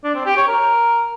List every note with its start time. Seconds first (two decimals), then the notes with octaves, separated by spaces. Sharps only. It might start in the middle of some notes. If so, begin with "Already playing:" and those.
0.04 D4
0.15 C4
0.26 G4
0.37 C#5
0.48 A#4